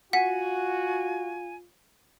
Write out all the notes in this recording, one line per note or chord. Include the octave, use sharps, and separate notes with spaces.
F4 F#4 F#5 G#5 B6